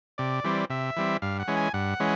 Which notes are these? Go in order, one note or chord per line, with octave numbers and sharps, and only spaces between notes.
C3 D5
E3 G3 C4
C3 E5
E3 G3 C4
G2 F5
F#5
E3 G#3 C#4
G#5
G2 F#5
E3 G#3 C#4